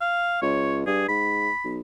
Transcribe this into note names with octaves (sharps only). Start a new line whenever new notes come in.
F5
C#2 C#5
G2 G#4
G#2 B5
B1